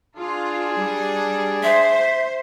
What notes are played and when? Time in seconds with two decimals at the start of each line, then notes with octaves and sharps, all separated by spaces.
0.17 D4 F4 G#4
0.78 G3
1.63 C5 E5